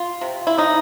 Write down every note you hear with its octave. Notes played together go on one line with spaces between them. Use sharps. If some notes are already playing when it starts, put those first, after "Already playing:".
Already playing: F4
C3
E4
C3 D#4